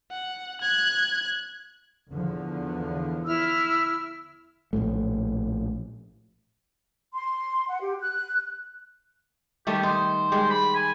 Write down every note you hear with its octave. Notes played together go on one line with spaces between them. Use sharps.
F#5
F#6 G#6
E2 D3 F3
E4 E6 F6
A#1 F2 A2 A3
C6
F#5
G4
F#6
D#3 G3 A3 G4
D#4 C5
G3 G#3 G4
B5
G#5